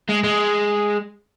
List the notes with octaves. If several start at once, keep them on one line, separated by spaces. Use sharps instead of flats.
G#3
G#3